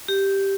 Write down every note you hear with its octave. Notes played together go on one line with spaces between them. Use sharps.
G4